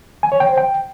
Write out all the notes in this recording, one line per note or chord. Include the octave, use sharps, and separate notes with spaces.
G#5
C#5
G5
C5
G5